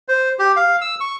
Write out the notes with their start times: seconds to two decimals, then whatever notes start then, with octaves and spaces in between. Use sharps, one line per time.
0.08 C5
0.39 G4
0.56 F5
0.81 E6
1.00 C#6